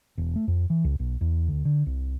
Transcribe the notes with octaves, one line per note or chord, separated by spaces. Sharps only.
E1
A3
F2
E3
C#2
B1
E2
D2
D3
C2